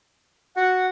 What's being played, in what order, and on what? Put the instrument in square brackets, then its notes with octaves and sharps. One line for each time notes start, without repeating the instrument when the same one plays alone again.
[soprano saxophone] F#4 [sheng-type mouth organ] F#5